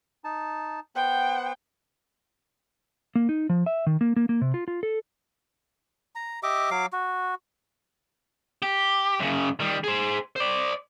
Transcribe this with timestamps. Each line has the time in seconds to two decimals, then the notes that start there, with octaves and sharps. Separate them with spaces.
0.24 D#4 A5
0.96 B3 C5 F#5 G5
3.15 A#3
3.29 D#4
3.50 F3
3.66 E5
3.87 D#3
4.01 A#3
4.16 A#3
4.29 A#3
4.41 C3
4.54 F4
4.68 F4
4.83 A4
6.15 A#5
6.43 G4 D#5 E5 D6
6.71 F#3 F5 D6
6.93 F#4
8.62 G4
9.19 F#2 C#3
9.60 D#3 G3
9.84 G#4 C5
10.36 C5 D5